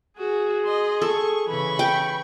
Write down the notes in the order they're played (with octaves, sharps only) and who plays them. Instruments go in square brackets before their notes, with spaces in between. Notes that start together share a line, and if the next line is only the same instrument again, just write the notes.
[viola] F#4 [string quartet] G#4
[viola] D#5 C6
[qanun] A4 [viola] C#6
[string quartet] C#3 E3 [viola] B5 C#6
[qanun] G5